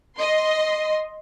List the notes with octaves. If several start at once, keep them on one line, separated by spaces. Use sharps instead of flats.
D#5 C6